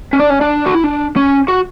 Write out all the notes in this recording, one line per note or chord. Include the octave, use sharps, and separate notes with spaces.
C#4
D4
C#4
D4
F#4
E4
D4
C#4
F#4